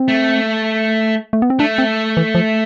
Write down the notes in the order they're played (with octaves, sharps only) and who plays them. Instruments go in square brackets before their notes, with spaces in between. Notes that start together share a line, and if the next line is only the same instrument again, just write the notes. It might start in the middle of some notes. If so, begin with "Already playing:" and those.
Already playing: [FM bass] C4
[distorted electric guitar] A3
[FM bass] A3
B3
C4
[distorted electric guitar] A3 [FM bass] D4
[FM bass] C4
E3
F3